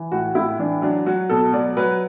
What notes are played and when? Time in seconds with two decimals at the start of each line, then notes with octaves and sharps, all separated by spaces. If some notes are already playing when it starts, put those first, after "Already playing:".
Already playing: E3
0.12 A2 F#4
0.35 A2 E4
0.59 E3 D4
0.82 F#3 D4
1.06 F#3 F#4
1.29 B2 A4
1.53 F#3 D5
1.77 F#3 B4